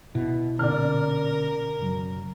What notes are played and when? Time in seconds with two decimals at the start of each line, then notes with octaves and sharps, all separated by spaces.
0.15 B2 E4
0.59 A#2 D3 C#4 A#4 D5 F6
1.80 F#2 C#3 F#3